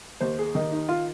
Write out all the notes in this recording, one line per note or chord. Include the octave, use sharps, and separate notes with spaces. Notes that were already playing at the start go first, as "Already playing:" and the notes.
D#2 C5
G#4
D#3 D#4
D#4
F4